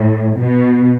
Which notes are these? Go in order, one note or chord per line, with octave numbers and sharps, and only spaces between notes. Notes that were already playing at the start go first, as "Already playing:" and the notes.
Already playing: A2
B2